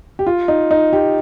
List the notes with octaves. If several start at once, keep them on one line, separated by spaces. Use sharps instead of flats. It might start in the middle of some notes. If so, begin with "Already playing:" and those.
G4
F4
D#4
D#4
G4